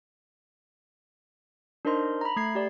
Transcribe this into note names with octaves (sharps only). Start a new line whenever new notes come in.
D4 D#4 A#4 C5 D#5 C6
A#5 B5
A3 G#6 C7
G4 D5